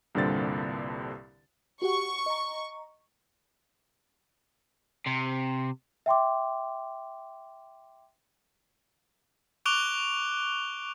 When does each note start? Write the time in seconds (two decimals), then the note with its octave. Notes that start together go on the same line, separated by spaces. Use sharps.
0.15 C2 G2 A#2 D3 C4 A6
1.82 F#4 G4 F#5 C#6
2.26 D#5 A#5
5.07 C3
6.06 E5 G5 C6 D6
9.66 C#6 D6 F#6 D7 F7 G7